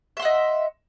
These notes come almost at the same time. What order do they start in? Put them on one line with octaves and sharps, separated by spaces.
E5 C6 F#5 D#5